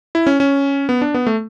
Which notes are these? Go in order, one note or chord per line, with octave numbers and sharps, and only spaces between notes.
E4
C#4
C#4
B3
D4
B3
A3